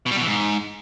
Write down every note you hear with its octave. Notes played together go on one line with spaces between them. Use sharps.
B2
G3
B2
E3
G#2